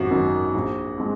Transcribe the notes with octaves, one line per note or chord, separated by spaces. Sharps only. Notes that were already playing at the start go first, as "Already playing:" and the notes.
Already playing: G#1 F#2 F#4
F#2 D#3
A#1
G#3 C4